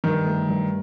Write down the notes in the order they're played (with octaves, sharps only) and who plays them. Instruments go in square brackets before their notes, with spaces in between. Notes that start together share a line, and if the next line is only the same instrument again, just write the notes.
[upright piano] G2 [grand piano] D#3
[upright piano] A3
G2